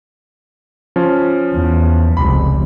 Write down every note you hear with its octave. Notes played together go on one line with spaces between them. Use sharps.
F3 C#4
E2
F1 C#2 C3 B5